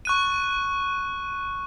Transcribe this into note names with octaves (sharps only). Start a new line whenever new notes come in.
C#6 F#6 D#7